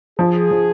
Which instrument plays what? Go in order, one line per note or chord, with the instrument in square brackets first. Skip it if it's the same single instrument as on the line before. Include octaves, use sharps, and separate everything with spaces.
[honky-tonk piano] F3 [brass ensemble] G#4
[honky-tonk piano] F3